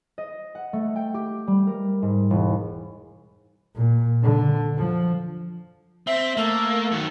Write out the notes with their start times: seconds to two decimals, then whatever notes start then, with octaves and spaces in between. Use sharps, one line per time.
0.18 D#5
0.55 F#5
0.73 A3
0.96 G5
1.14 G4
1.47 G3
1.67 A#4
2.02 G#2
2.30 E1
3.75 A#2
4.23 D3
4.78 F3
6.07 C4 E5
6.37 A3 A#3
6.92 D#3 F#3